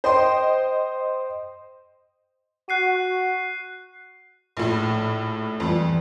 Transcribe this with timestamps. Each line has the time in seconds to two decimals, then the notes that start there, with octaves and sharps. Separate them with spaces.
0.04 C5 D#5 G5 C6
2.69 F#4 F#6 C7 D#7
4.57 A#1 A2
5.60 F2 E3 G3